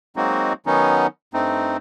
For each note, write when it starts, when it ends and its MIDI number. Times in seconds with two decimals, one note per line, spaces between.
0.16 0.53 54
0.16 0.53 56
0.16 0.53 58
0.16 0.53 60
0.16 0.53 63
0.16 0.53 66
0.66 1.07 51
0.66 1.07 54
0.66 1.07 59
0.66 1.07 61
0.66 1.07 63
1.34 1.77 43
1.34 1.77 57
1.34 1.77 60
1.34 1.77 63